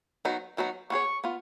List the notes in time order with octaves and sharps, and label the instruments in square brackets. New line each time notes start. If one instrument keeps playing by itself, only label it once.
[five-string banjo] D#3 F#3 B3 D#4
D#3 F#3 B3 D#4
[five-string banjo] B3 F4 G#4 C#5 [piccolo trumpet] C#6
[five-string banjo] B3 F4